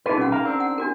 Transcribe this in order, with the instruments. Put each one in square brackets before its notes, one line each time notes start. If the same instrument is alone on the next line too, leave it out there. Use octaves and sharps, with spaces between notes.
[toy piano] D#4 G#4 A#4 [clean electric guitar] F4 B4
[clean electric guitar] B1 [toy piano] C#4 F#4 F#5
[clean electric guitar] A#4 F5
C4 D4 A#4
[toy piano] F#5
D4 F#4 A#4